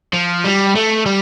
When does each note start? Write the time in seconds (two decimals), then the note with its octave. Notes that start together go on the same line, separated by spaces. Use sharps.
0.13 F3
0.45 G3
0.75 A3
1.06 G3